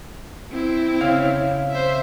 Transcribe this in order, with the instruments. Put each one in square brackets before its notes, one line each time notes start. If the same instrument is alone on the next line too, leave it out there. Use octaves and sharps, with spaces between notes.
[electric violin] C4 E4
[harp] C#3 F5
[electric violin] C5 E5